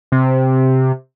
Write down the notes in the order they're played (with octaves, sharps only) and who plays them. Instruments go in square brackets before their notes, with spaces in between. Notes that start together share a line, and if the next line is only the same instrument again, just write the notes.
[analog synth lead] C3